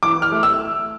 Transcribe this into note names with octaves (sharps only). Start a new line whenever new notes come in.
E3 D6
F6
A3
E6